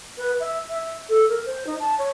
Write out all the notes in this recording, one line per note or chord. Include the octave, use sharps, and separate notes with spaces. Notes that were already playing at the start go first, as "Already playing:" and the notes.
B4
E5
E5
A4
A#4
C5
D#4
A5
C#5